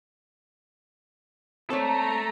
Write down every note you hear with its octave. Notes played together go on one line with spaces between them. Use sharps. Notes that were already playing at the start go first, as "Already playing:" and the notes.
A3 C4 A4 C#5 D5 A#5